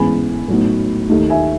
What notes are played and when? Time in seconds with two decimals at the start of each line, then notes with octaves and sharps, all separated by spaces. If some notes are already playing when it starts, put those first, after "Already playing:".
Already playing: A1 G#2 E3 G#3 B3 G#5 B5
0.48 A2 F#3 B3 D#4
1.09 D#2 D#3 A3 D#4
1.30 E5 G#5